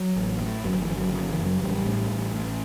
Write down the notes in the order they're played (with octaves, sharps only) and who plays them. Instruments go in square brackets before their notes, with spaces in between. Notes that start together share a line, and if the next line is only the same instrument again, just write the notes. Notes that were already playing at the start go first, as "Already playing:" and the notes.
Already playing: [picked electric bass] F#3
A1
A2
G1 F#3
E3
G1
F#3
C#3 F#3
E3
F#2
F#3
A1 G3
A2
A1
A2